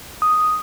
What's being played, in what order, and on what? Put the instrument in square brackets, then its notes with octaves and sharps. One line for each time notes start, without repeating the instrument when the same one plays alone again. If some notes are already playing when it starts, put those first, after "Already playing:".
[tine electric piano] D#6